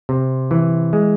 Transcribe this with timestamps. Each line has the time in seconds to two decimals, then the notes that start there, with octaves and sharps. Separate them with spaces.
0.09 C3
0.51 E3
0.93 G#3